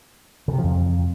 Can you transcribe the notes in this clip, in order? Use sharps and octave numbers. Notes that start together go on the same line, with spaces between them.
C#3
C3
F3
F2